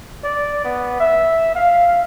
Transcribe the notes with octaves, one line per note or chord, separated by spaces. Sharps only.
D5
B3
E5
F5